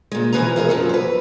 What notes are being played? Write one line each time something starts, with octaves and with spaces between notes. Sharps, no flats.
A#2 G#3
B2 E3 F3 B4 G#5 A#5
D#4 E4 G#4 A#4
F#2 F3 A4
B4 C5